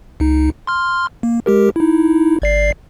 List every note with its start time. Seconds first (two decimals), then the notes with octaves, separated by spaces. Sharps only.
0.20 C#2 D#4
0.67 C6 F6
1.23 A#3
1.46 G#3 G4 A#4
1.76 D#4 E4
2.42 G#1 D5 C7